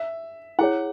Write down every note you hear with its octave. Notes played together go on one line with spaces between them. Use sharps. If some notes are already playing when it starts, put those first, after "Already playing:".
Already playing: E5
E4 G#4 C#5 F#5